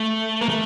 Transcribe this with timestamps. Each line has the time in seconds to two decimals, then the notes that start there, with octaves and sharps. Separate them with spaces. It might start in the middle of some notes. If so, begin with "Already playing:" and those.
Already playing: A3
0.41 A#3
0.49 A3